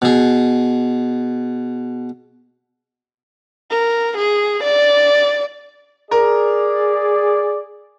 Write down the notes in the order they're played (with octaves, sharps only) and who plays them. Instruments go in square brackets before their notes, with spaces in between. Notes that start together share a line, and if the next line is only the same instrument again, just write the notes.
[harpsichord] B2 G#4
[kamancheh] A#4
G#4
D5
[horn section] G#4 D5 [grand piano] A#4 A#5